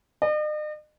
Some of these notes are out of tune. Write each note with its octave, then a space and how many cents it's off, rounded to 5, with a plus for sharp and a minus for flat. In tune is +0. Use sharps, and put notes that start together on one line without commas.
D#5 -45